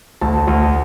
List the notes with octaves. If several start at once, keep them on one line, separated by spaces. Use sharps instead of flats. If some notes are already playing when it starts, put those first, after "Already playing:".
D2 A5
D2